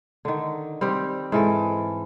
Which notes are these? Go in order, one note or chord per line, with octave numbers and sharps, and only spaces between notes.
D3 D#3
G3 C4 G4
G#2 E3 A4